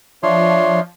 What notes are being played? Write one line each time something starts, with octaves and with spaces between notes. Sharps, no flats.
F3 D4 C#5 E5 C6